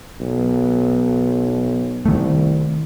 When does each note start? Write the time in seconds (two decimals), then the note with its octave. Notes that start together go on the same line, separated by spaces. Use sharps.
0.20 B1
2.06 C2 D#3 A3